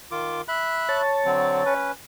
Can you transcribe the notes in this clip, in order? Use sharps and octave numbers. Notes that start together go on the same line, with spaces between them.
D#3 F4 D6
E5 B5 F#6
C#5 A5
D3 F#3 C4
C#4 B4